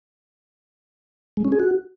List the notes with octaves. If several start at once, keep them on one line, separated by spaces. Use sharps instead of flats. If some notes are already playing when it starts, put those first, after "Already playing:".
G#3
C#4
G#4
F#4